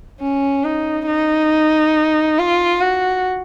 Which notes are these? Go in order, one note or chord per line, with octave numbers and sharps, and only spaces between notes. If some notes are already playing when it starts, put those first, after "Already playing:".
C#4
D#4
D#4
F4
F#4